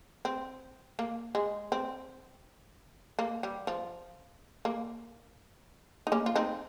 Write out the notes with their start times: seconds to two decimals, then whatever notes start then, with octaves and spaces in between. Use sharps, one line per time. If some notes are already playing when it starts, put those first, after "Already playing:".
0.25 C4
0.99 A#3
1.35 G#3
1.72 C4
3.19 A#3
3.43 G3
3.67 F3
4.65 A#3
6.07 D#4
6.12 A#3 C#4
6.26 F4
6.36 C4 D#4